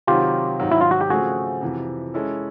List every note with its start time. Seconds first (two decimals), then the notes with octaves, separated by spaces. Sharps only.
0.07 C3 D#3 F#3 F4 G4
0.60 G#2 D#3 F#3
0.71 E4
0.81 F4
0.91 F#4
1.01 G4
1.10 C#3 F3 A3 C4 F#4 G#4
1.61 F2 C3 E3
2.14 G#3 C#4 E4 A4